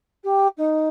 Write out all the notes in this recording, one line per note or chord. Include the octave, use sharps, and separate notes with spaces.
G4
D#4